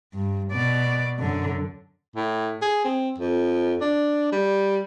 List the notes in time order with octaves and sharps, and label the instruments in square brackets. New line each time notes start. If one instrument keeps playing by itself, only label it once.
[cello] G2
B2 D5
F#2 D3
[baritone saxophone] A2
G#4
C4
F2
D4
G3